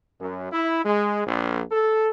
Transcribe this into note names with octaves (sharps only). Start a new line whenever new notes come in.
F#2
E4
G#3
A#1
A4